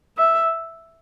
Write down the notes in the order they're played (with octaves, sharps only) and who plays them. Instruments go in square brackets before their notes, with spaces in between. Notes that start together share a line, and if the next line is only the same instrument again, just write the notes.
[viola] E5